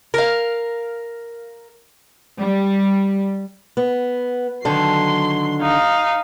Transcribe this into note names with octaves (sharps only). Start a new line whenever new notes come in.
A#4 F5
G3
B3
D3 D#3 F#3 A4 C6
D#4 F5